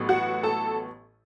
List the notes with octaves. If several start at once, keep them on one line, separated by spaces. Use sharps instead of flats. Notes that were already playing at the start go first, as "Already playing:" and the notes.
Already playing: A1 A2 F#3 B3
F#4 F#5
A4 A5